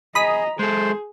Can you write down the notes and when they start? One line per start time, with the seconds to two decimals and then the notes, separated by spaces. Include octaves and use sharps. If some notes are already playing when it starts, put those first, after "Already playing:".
0.15 G#4 D#5 A#5 B5 D#6 B6
0.59 G#3 G#4 A4 C5